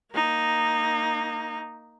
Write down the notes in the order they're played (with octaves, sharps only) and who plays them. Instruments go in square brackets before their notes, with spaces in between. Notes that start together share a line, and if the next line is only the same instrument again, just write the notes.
[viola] A#3 D#4